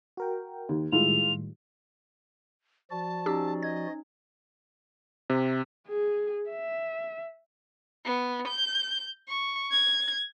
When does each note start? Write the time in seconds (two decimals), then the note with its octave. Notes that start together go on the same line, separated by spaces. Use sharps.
0.17 F#4 A#4 G5
0.69 D#2
0.92 A2 D#3 G3 G#3 E4 F4 F7
2.91 F3 F#4 D5 A5
3.26 C#4 D#4 G4 E6
3.63 D#5 G#6
5.30 C3
5.88 G#4
6.50 E5
8.05 B3
8.48 G6
9.29 C#6
9.71 G#6